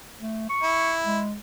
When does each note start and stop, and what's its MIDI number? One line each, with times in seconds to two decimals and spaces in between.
0.20 0.49 57
0.49 0.93 85
0.62 1.19 64
1.05 1.36 56